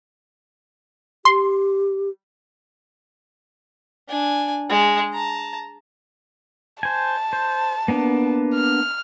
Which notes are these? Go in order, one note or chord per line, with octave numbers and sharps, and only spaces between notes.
G4 C6
D4 G#5
G#3
A5 A#5
C5 G#5 A5
C5
A#3 B3 D4
F6